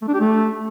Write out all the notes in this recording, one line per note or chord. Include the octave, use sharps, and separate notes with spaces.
A3
D4
G4
A3